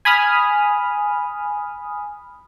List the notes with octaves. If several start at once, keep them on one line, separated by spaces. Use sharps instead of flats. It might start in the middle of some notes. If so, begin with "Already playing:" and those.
G#5 B5 D#6 F6